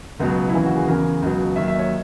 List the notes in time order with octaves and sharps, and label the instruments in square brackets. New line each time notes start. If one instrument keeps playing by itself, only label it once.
[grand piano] C#2 B2 F#3
E4
D#2 C#3 E3 D#4
F#4
G#4
E2 C#3 E3 A#4
C#2 B2 F#3
D#2 D#3 F#3 E5
E5
D#5
C#5